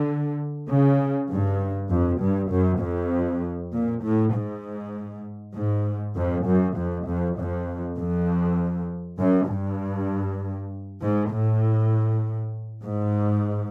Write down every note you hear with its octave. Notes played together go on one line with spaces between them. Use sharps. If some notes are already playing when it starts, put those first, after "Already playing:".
Already playing: D3
C#3
G2
F2
G2
F#2
F2
A#2
A2
G#2
G#2
F2
F#2
F2
F2
F2
F2
F#2
G2
G#2
A2
G#2